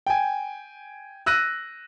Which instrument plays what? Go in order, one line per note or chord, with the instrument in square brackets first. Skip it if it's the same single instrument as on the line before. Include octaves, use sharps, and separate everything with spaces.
[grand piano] G5 G#5
E6 F#6 A#6 D#7